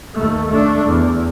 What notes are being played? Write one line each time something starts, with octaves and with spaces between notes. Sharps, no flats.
D#2 A3
A3 D4
E2